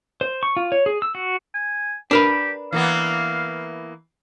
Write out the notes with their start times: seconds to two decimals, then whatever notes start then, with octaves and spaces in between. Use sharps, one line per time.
0.21 C5
0.43 C#6
0.57 F4
0.72 C#5
0.86 G#4
1.02 E6
1.15 F#4
1.54 G#5
2.11 D4 G4 A#4 B4
2.73 E3 A#3 B3 F5